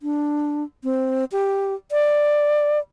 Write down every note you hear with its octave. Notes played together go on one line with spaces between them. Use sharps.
D4
C4
G4
D5